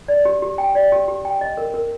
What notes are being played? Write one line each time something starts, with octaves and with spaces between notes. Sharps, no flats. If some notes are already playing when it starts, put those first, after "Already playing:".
D5
G4
G4
G5
D5
G4
G4
G5
D#5
A#4
A#4